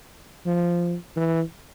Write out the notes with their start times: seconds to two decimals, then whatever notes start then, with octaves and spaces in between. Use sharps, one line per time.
0.46 F3
1.16 E3